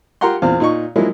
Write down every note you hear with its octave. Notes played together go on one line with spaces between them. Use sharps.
F4 G4 A#4 F#5 A#5 C6
E2 A#2 C4 F5
A#2 D#4 C#6
F3 F#3 G#3 A#3 E4 F#4